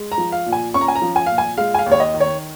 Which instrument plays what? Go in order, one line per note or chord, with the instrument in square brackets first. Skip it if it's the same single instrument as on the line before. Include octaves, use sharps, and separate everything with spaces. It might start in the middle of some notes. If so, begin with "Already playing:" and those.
Already playing: [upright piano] G#3
A#5
F3
F5
A#2
G#5
C#4 C#6
A#5
G#5
A#5
F3
G#5
A#2 F5
G#5
G#3 F5
G#5
F5
D#2
C#5
D#5
D#3
C#5